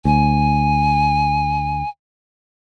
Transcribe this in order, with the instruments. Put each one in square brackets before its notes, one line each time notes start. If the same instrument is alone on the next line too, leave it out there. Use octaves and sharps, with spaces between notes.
[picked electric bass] D2 [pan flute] G#5